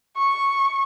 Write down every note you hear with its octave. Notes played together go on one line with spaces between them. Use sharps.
C#6